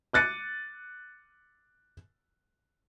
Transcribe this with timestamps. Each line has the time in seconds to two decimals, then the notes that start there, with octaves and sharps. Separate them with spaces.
0.13 D6 F#6 A6 C#7 D#7